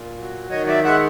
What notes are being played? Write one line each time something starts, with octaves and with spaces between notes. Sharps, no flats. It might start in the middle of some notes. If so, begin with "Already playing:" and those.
Already playing: A#2
F#3
D#3 C#5 D#5
D5 E5
G#3 E5 F#5